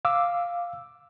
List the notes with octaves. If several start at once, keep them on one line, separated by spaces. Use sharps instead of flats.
F5 D6 E6